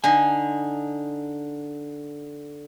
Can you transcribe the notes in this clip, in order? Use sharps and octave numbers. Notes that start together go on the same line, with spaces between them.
D3 D#4 G#5